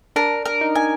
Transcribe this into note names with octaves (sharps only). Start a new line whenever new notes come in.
D4 A#4
A#4
D#4
G#5